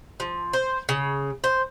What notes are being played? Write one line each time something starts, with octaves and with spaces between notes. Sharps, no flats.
F3
C5
C#3
C5